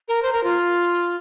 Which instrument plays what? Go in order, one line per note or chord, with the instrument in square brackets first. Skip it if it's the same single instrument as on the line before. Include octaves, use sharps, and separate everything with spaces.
[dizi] A#4
C5
A#4
F4